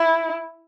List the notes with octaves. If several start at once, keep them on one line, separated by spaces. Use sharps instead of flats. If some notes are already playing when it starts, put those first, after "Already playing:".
Already playing: E4